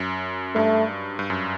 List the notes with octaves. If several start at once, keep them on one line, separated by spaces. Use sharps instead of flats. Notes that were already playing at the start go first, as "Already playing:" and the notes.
Already playing: F#2
G2 A3
G2
F#2